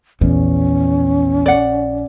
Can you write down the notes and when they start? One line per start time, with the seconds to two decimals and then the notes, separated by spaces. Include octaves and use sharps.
0.21 A#1 E2 C#4
1.46 D5 F#5